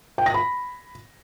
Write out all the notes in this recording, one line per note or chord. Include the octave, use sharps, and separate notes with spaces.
G5
A#6
B5